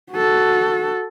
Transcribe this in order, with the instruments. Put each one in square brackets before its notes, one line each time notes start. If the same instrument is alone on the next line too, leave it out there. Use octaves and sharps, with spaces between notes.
[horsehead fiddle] F#4 A4